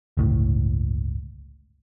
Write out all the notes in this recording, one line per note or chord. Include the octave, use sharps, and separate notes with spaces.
G1 C#2 A2